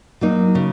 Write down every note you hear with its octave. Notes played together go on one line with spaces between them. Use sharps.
F#3 A#3 D#4
C#3